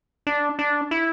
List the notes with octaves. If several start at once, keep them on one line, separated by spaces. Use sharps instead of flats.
D4
D4
E4